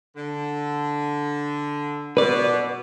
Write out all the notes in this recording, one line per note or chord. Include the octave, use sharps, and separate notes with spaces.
D3
B2 B4 D5